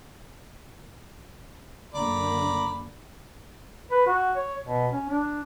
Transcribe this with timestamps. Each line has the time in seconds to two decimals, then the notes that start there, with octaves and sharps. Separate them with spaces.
1.94 F#2 D3 A#3 D5 A#5 B5
3.91 B4
4.07 F#4
4.36 C#5
4.64 B2
4.92 C#4
5.09 D4